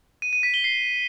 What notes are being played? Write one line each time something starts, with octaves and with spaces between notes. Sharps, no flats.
D#7
D#7
B6
G7
C7